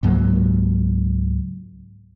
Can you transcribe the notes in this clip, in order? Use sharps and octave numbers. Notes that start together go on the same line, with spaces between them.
C#2 G#2 F#3 A#3